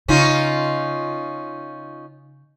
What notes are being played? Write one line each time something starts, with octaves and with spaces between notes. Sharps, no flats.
C#3 C#4 D#4 F4